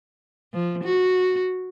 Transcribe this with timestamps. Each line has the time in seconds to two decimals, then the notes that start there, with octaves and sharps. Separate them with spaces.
0.54 F3
0.84 F#4